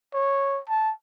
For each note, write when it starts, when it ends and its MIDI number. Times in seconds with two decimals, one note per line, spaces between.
0.14 0.61 73
0.69 0.92 81